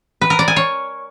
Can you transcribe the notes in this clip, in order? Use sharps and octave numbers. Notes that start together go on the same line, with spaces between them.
B4
A#4
D5
G#5
C#5